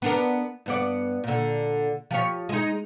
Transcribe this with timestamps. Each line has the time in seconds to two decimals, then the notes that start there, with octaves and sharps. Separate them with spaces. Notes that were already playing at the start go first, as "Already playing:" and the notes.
0.02 B3 D4 A#4
0.66 G2 B3 D5
1.24 A#2 D3
2.11 F3 G4 C#5
2.49 G#3 D#4